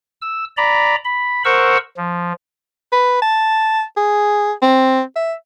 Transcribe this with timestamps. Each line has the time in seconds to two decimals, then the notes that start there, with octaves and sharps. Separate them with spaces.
0.22 E6
0.57 D5 A#5 B5
1.04 B5
1.45 A#4 C5 F#5 C#6 E6
1.97 F3
2.92 B4
3.22 A5
3.97 G#4
4.62 C4
5.16 E5